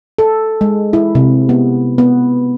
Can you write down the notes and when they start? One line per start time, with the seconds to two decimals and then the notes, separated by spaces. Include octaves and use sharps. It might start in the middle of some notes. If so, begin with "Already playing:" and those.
0.18 A4
0.61 G#3
0.93 E4
1.15 C3
1.49 B3
1.98 B3